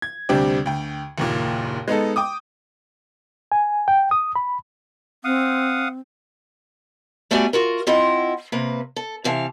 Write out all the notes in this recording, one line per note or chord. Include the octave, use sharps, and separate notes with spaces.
G#6
D2 C3 G3 C4 D4 G4
D2 G5
F#1 D#2 A#2
G#3 B3 D#4 A4
G5 D6 D#6
G#5
G5
D#6
B5
C4 F5 F#5 D#6
G3 A3 B3 F#4 D5 G#5
F4 F#4 A#4
C4 E4 F4 D#5 F#5
C3 A#3 B4
A4
C3 E3 F5 A5